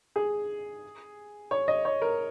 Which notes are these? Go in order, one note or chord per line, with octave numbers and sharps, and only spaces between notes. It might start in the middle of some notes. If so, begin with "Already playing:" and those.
G#4
C#5
D#5
C#5
A#4